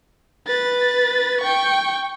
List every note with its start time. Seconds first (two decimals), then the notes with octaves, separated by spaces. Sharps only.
0.47 B4 A6
1.41 G5 C#6